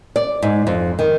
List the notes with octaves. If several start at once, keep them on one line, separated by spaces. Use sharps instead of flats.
D5
G#2
F2
D#3